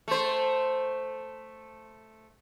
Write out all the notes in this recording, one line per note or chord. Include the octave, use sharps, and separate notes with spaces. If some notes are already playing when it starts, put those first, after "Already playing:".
A3 C5